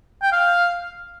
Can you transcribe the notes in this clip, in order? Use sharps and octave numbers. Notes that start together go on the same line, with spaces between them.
G5
F5